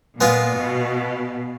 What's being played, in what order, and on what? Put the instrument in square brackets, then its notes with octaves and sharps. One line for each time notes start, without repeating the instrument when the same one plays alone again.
[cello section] A#2 [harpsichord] G#3 B3 F4
[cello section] B2